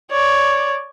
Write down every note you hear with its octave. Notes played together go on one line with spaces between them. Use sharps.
C#5 D5